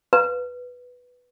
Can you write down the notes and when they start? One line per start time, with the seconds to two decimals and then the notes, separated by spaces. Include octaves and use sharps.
0.13 B4